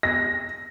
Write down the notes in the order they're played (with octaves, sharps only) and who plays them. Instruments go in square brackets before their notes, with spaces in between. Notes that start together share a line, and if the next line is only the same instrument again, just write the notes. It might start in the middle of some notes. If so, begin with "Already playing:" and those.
[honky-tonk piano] A#6